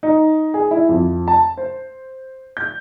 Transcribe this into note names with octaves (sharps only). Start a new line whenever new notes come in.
D#4
G#4
E4
F2
A5
C5
G6